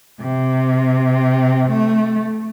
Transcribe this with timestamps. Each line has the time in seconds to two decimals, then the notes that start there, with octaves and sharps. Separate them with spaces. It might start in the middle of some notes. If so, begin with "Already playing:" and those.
0.20 C3
1.68 A3